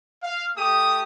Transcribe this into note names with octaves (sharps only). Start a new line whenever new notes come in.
F5
A3 G4 D#6